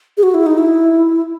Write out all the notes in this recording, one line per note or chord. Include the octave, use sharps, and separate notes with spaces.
G#4
F#4
E4
D#4
E4